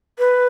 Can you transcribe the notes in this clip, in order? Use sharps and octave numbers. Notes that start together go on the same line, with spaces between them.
B4